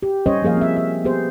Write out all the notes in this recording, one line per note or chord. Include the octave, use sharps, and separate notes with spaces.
G4
G3 C#4 C5 C#5 D#5
F3 A#3 G#4 A#4 F5
C4 E5
E5
B3 G4 G#4 C5